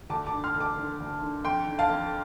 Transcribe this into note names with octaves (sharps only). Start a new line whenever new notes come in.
D2 A5 D6
A5 D6
D3
C6 F6
D2 F6
A5 D6
D3
D2
D3
F2 G5 C6
D3
F5 A5
F2